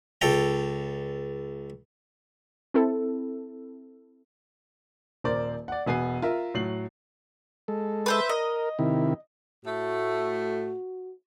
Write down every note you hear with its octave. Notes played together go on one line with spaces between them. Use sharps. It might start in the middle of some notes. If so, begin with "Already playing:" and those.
C#2 A4 G5 A#5
C4 E4 A4
D#1 A#4 C5 D5 D6
D5 F#5
E1 B3 G#5 C7 D#7
F4 A#4 E5
A2 F#3 C7 F#7
G#3 A4
B4 C5 E5
A#4 D#5
C3 D#3 E4
A2 A3 F#4